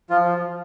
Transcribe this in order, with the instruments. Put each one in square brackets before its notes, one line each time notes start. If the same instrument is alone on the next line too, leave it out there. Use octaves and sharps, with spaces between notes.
[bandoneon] F3 F4